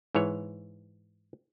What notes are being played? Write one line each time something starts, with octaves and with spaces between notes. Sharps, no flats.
G#2 E3 C#5